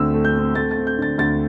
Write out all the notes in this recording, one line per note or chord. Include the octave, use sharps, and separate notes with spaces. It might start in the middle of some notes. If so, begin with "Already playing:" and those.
Already playing: D2 D3 A3 C4 E6
A3
G6
C4
A3 A6
A6
C4
G6
D3 A6
D2 A6